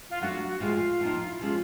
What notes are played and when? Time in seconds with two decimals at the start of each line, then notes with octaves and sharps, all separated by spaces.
0.10 F4
0.21 F#3 A3 D4 F4 F#4
0.60 A2 F3 G#3 F4
1.00 A2 F3 A#3 D#4
1.26 E4
1.39 C3 F3 G#3 C#4 F4